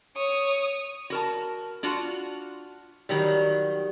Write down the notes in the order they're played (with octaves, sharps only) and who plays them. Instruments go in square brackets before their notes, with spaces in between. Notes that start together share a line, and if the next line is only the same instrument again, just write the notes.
[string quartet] C#5 D#6
[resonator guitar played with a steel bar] F#4 A#4 A5
D4 F4 F#4
[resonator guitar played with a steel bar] D#3 F#3 G3 [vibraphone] G4